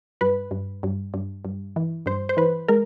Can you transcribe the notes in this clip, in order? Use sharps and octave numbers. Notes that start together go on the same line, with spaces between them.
G2 B4
G2
G2
G2
G2
E3
G2 C5
C5
E3 B4
G#3 A#4